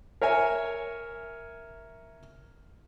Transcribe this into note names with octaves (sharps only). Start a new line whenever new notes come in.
A#4 C#5 E5 G#5